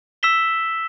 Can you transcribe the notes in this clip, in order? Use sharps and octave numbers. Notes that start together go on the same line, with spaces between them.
E6 B6 E7 G7